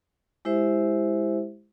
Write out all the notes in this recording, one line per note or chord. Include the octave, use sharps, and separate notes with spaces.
G#3 E4 G4 C5 E5